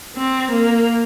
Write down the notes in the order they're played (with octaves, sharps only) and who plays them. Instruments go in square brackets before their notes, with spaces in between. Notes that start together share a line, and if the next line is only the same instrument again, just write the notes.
[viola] C4
A#3